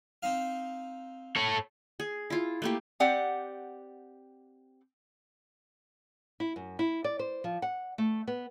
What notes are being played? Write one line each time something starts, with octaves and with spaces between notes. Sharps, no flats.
C4 D#4 F5
A4 C#5
G#4
E4 F4
A3 A#3 G4
C4 G4 D5 F#5
E4
F#2
E4
D5
C5
F3
F#5
A3
B3